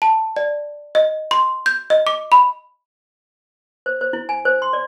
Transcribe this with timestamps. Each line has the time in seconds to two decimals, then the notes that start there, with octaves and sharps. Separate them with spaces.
0.02 A5
0.36 D5
0.95 D#5
1.31 C6
1.66 G6
1.90 D#5
2.07 D6
2.32 B5
3.86 C5
4.01 C5
4.13 E4
4.29 G#5
4.45 C5
4.62 C6
4.73 D5